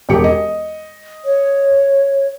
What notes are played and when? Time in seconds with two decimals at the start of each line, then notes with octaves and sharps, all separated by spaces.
0.09 E1 G4 C#7
0.24 D#5
1.25 C#5